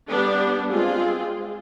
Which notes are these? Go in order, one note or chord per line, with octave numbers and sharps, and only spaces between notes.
G3 B3 D4
G#3 C4 F4 G#4